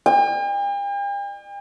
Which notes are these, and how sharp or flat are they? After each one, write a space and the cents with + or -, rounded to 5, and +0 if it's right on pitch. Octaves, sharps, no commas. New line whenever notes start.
G5 +45